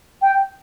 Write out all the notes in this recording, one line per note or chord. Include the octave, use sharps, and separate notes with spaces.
G5